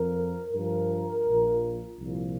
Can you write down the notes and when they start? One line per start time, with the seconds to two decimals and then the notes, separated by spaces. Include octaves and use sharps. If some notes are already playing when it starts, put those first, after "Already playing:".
Already playing: F2 F3 A#4
0.53 G2 F3 A#4
1.27 A#1 A#2 F3
1.99 C2 A#2 F3